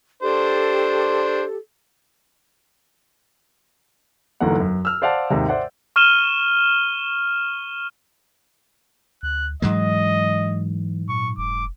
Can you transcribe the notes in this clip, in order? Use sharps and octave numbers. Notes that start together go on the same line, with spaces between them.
D4 G4 A4 C5
G1 E2 F#3 A#3 D#4 F#5
F#2
E6 F6
C5 D5 F5 F#5 A5
D#2 G#2 C3
C5 D5 E5 F#5
C#6 F6 D#7 E7 G7
D2 F#6
G#2 E3 F#3 G#3 D#5
A#2 C#6
F1 D6